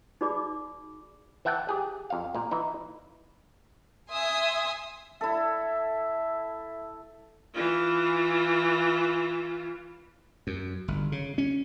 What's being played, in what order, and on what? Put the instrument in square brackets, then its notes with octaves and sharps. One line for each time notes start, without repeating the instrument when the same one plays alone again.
[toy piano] D#4 F#4 G#4 D5 B5 D6
[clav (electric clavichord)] E3 E5 F#5 G5 A5
G4 G#4
F2 F5
A#2 A#3
E3 D#4 E4
[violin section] E5 G#5 C6 D#6
[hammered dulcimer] E4 A4 [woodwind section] E5
[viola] E3 F4
[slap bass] F#2
G1
C#3
C#4